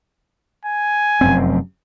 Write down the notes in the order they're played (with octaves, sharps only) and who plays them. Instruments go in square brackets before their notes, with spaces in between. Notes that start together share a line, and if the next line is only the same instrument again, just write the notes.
[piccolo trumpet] G#5
[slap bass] F1 F#2 C4